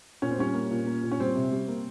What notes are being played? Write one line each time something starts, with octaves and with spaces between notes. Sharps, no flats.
A#2 C#4
C4
G3 C#4
A#3
A#2
A#3
A#2
C#4
G3 C4
C3
G3
A#3